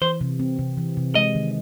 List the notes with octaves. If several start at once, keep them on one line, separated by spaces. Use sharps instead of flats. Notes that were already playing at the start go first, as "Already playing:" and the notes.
E3 C5
C3
C4
C3
E3
C3
G#3 D#5
D#3